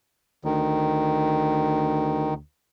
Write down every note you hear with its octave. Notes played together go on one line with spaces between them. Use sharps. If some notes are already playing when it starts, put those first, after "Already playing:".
D2 D#3